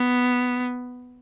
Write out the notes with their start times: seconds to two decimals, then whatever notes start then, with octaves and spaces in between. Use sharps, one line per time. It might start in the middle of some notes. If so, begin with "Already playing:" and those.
Already playing: B3